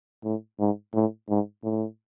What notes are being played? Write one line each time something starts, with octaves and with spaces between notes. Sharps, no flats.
A2
G#2
A2
G#2
A2